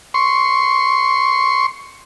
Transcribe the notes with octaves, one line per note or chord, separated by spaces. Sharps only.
C6 C#6